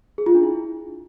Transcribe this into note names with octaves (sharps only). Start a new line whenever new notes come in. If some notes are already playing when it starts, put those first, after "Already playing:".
G#4
F4
D4
E4